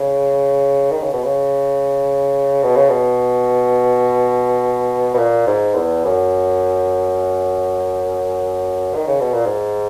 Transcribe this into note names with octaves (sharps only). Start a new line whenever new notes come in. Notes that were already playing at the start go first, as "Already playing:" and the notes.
Already playing: C#3
D#3
C#3
B2
C#3
B2
C#3
B2
B2
A#2
G#2
E2
F#2
D#3
C#3
B2
A#2
G#2